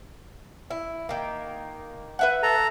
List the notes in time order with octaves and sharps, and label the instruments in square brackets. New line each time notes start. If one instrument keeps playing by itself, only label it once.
[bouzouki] E4
D#3 A#3
B4 E5 F#5
[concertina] A4 A#5